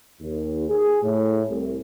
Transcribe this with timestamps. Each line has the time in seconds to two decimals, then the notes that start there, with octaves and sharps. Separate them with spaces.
0.20 D#2
0.69 G#4
1.03 A2
1.48 C2 C3